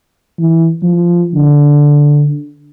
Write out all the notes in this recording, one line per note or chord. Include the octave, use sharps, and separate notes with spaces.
E3
F3
D3